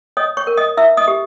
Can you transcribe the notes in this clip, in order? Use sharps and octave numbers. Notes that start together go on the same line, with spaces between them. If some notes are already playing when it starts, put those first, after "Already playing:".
C#5 D#5 D#6
C#5 C#6
A#4
D#5 D#6
E4 E5 E6
D#5 D#6
G4